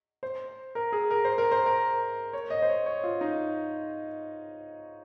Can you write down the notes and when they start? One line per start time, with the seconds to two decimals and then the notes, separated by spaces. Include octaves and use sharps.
0.23 C5
0.75 A#4
0.92 G#4
1.10 A#4
1.25 C5
1.38 A#4
1.52 C5
1.66 A#4
2.33 C#5
2.50 D#5
2.62 C5
2.69 C#5
2.86 C#5
3.04 F4
3.21 D#4